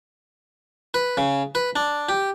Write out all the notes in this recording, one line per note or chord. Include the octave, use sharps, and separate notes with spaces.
B4
C#3
B4
D4
G4